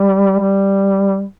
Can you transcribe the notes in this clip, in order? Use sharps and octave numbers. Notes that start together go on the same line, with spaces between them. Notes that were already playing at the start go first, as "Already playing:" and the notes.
Already playing: G3
G3